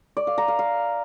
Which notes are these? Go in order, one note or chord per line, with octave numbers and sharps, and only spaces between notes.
D5
F5
A#5
F5
F5